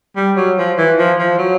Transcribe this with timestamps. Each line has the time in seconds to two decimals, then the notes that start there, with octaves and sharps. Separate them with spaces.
0.16 G3
0.36 F#3
0.58 F3
0.78 E3
0.98 F3
1.19 F3
1.38 F#3